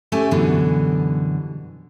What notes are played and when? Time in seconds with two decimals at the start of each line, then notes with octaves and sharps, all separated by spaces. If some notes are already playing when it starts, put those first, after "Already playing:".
0.12 D2 A3 C#4 G4 A4 G#5
0.31 F#2 B2 D3 E3 G3